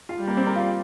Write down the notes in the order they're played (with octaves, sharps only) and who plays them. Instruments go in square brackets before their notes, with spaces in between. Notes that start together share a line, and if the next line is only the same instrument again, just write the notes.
[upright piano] F4 F5
[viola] G3
[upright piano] A#3 A#4
C4 C5
A#4 A#5
F4 F5